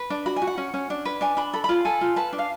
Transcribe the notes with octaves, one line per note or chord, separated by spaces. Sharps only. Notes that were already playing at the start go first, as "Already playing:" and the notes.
Already playing: B4
D4
F#4 B5
G#5
F#4
F#5
C#4
C#4
D4
B4
D4 G#5
D4 B5
A4 B5
F4 B5
A4 G#5
F4
B4 A5
D4
F5